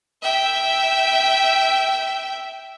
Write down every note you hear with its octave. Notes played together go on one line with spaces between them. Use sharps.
E5 G5